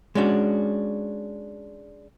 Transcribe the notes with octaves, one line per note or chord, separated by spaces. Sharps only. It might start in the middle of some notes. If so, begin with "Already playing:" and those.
G#3 C#4 D4 F#4